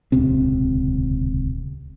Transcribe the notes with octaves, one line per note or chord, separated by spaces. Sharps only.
D#1 C#2 C3 C4